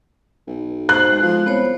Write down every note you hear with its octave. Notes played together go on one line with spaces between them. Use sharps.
B1
C5 F#6
G#3
F3
C2 B3 C5 C#5